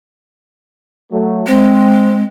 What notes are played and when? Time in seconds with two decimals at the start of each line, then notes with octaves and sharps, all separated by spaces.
1.12 F#3 A3
1.47 G#3 C4